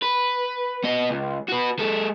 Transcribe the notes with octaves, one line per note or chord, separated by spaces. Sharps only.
B4
B3 D#5
C#2
F#4 B4
G#3 A4